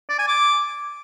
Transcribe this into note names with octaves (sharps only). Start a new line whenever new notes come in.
D5
G#5
D6